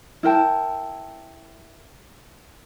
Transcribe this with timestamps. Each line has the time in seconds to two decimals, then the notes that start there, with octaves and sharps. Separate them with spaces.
0.23 E4 A#4 G5 A5